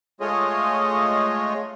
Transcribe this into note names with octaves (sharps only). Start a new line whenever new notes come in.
G#3 A3 F4 G#4 C#5 D#5